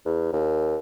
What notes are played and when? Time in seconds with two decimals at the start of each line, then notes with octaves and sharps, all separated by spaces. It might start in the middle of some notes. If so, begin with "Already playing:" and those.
0.06 E2
0.33 D#2